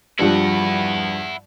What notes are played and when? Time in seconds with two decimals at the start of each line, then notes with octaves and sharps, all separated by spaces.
0.19 G2 F3 G3 E4 F#5